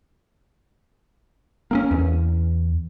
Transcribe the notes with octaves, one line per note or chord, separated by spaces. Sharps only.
A#3 C4 C#4
E2